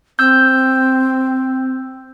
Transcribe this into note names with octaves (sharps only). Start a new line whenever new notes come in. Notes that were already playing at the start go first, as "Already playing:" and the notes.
C4 E6 G6